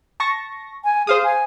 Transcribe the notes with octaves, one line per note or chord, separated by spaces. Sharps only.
A5 C#6 A#6
G#5
G#4 C5 F5 D#6
G#5